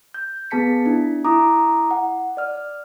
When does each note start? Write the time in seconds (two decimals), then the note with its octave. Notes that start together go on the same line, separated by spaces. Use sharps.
0.14 G6
0.51 B3 G#4 A5 B6 C#7
0.86 D4 E4
1.24 E4 A#5 D6 D#6
1.91 F#5
2.37 D5 F6